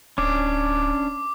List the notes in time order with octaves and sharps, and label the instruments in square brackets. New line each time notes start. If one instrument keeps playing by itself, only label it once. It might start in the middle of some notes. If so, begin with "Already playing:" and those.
[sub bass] D1 [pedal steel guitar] C#4 D4 [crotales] D6